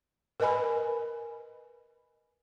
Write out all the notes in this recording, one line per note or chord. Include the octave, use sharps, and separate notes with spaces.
A#4 B4 D#5 G#5 B5